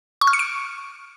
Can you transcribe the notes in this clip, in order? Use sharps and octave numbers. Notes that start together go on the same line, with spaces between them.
C#6
F6
C#7
D7